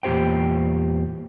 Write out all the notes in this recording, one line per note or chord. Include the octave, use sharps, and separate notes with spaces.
E2 A#2 G4 C5 G5